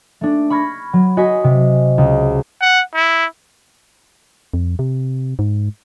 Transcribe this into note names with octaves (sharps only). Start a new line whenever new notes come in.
A3 D4
B5 C#6 F6 G#6 A#6
F#3
F#4 D#5 G#5 C6 B6
C3
C#2
F#5
E4
F2
C3
G#2